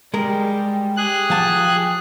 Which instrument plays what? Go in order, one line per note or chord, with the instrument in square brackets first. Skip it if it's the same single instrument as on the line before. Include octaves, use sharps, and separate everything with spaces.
[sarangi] G3 [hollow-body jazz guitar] G#3 A#4
[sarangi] G4 [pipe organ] G#4 F#6
[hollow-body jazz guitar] F3 F#5 A5